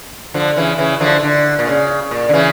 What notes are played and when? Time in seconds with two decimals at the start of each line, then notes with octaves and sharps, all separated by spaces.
0.34 D3 F3
0.56 C#3 E3
0.78 C#3 E3
1.00 D3 F3
1.23 D3
1.59 A#2
1.67 C#3
2.11 A#2
2.29 D3
2.33 C#3 E3